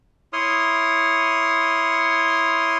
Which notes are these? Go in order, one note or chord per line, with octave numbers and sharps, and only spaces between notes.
E4 C#5 C6 D#6 F6